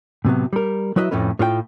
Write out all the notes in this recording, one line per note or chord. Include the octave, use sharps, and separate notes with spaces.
A2 C3 F#3 B3
G3 A#4
F#3 E4 B4 D#5 E5
F2 A2 A3 C#4 B4
A2 F4 C5 G5